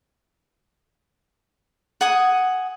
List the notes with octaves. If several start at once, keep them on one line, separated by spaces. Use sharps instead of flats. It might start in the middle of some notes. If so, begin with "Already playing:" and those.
F#5 G#5 D#6